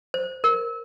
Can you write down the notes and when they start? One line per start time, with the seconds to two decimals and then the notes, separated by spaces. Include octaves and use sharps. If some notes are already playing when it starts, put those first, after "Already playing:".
0.14 C5
0.44 A#4